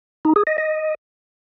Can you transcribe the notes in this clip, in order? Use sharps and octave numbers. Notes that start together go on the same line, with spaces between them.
D#4
G#4
D#5
D#5